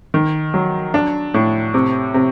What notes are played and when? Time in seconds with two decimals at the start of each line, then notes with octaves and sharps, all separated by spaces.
0.14 D#3
0.54 F#3
0.94 D4
1.34 A2
1.74 C3
2.14 C3